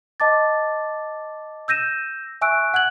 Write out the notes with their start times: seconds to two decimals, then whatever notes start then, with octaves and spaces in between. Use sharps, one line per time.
0.20 D#5 A5 D6 A6
1.68 E6 G6 A#6 D#7 E7
2.41 E5 G#5 C#6 E6 F#6 D7
2.74 F#5 F#6 G#6 F#7